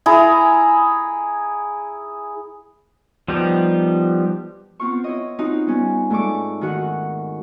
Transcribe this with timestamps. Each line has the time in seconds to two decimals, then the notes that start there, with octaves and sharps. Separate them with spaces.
0.06 E4 G#4 A#5
3.28 F3 G3 B3 D#4 G4
4.80 B3 C4 F4 C#6
5.04 E4 C#5 D#5
5.39 C4 D#4 F4 F#4
5.67 G3 B3 C#4
6.10 G#2 A3 D5 C#6 D6
6.61 D#3 F#4 F#5